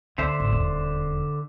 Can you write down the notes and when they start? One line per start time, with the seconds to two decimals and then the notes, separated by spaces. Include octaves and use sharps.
0.18 D2 D3 C5 E5
0.40 A1
0.52 D#1 E2